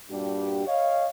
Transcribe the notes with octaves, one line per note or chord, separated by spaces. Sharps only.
G2 A#2 G3 D4 F#4 G4
C#5 D#5 F5